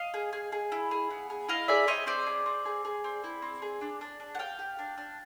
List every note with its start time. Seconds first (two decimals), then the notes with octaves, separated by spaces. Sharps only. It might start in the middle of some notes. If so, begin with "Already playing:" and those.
Already playing: D#5 F5
0.14 G#4
0.33 G#4
0.52 G#4
0.72 E4
0.91 G#4
1.10 B3
1.30 G#4
1.48 E4 D#5 F5
1.68 G#4 D5 E5
1.87 C4 C#5 D#5
2.06 C4 C5 D5
2.27 G#4
2.46 C4
2.65 G#4
2.85 G#4
3.04 C4
3.24 E4
3.42 C4
3.62 G#4
3.81 D4
4.01 D4
4.20 D4
4.35 F#5
4.39 G4 F5 G5
4.59 G4
4.79 D4
4.98 D4